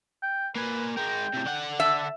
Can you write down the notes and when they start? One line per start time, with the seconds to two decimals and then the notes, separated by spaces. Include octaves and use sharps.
0.23 G5
0.56 A#3 B4 G#5
0.97 G#3 A#4 G5
1.34 A2 C3
1.46 D3 F#5
1.80 E5 A5